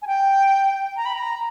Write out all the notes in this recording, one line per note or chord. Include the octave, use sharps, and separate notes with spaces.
G#5
G5
A#5
B5
A#5